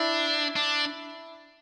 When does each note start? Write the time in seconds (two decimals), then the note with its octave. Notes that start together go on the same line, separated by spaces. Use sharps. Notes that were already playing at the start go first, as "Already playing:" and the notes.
Already playing: D4 E4
0.56 D4